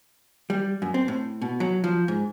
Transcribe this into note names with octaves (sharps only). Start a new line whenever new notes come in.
G3
F#2
C4
A2
B2
F#3
F3
G#2